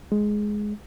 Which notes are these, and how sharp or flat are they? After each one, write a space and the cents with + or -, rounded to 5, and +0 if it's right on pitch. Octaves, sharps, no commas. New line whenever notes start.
G#3 +5